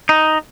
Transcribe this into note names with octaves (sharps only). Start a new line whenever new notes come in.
D#4